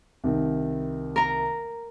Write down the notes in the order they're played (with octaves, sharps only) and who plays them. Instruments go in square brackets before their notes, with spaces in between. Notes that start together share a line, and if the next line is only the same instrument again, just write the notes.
[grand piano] C2 D#3
[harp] A#4 A#5